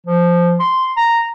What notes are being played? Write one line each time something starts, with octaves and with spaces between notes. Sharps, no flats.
F3
C6
A#5